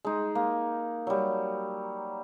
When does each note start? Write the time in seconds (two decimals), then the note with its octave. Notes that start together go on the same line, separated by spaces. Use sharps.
0.05 G#3 D#4
0.35 A#3
1.07 F#3 G3